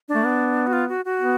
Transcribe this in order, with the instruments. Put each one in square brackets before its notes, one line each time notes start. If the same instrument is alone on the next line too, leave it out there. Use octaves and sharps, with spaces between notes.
[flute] D4
[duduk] A3
B3
[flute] F#4
F4
F#4
F#4
[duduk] B3